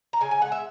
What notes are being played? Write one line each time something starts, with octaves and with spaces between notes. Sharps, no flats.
A#5
C#3 G#5
G#5
G#3 F#5
E5